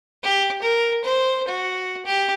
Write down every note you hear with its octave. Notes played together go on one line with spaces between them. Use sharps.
G4
A#4
C5
F#4
G4